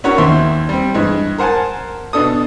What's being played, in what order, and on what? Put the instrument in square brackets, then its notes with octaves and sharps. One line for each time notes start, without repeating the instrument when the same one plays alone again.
[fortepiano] C#4 D4 E4 F#4 A#4 C#5
D#2 C5 E5 C6
G3 C4
G2 E3 G#3
A#4 C5 F#5 G#5 A5
B2 D4 A4 D#6